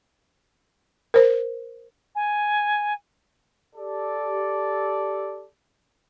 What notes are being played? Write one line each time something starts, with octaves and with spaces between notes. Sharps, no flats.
A#4 C5
G#5
G4 A4 D5